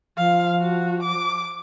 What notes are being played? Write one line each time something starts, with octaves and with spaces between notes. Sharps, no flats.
F3 F5
F#4
D6